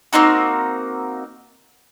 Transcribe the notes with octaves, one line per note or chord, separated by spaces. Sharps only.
A#3 C4 D#4 F#4